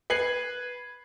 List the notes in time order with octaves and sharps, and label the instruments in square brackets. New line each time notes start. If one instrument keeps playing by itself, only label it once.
[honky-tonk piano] B4 G#6 C7 F#7